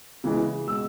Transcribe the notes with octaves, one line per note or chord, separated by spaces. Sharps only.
C#3 E3 G#3
B2 G#3 E6